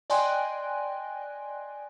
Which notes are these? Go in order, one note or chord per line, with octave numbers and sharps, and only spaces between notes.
D5 D#5 G5 G#5 C6 F#6